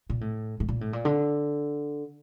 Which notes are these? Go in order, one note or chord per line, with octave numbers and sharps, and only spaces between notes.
A#2
A2
A2
A#2
A2
A#2
D3